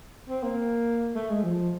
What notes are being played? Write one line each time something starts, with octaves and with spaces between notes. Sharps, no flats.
C4
A#3
A3
G#3
F3